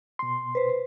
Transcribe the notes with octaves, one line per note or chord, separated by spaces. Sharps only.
B2 C6
B4 C5